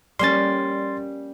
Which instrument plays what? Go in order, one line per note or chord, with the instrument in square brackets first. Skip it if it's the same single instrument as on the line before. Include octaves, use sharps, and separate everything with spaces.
[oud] G3 A#3 C#4 [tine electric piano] C6 A6